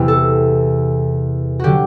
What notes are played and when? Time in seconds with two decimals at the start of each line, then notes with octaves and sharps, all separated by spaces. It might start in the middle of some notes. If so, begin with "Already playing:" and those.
Already playing: E2 C3 E3
0.08 A4
1.60 F#4
1.64 D3 F#3 G4